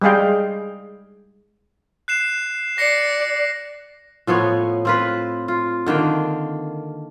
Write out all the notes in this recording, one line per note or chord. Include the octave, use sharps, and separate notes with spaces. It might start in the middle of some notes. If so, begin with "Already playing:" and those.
G3 G#3 G#4 F5 G5
F#6 C7 E7
D5 A#6 C7 C#7
A2 F3 B3 C#5
C4 F4 B4
F4
D3 D#3 A#3 G5